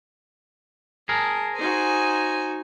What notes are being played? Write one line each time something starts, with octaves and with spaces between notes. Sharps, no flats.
G#4 A#4 A5
D#4 F#4 C5 G#5